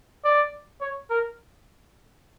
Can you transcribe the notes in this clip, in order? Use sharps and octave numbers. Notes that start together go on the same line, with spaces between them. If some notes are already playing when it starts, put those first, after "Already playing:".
D5
C#5
A#4